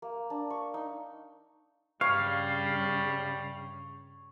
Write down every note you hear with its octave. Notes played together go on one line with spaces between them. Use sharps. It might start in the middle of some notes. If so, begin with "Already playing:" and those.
A#3
D4
C#6
D#4
G2 C#3 G3 C#5 F5